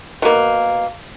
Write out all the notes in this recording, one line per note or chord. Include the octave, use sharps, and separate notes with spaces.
B2 A#3